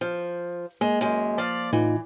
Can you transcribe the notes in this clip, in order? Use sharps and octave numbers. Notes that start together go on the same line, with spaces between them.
F3
G#3 A#3
F#2 G#3
F3 D5 F5
A2 E3 D#4 F4